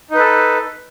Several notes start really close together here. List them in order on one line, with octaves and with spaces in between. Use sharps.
D#4 B4 A4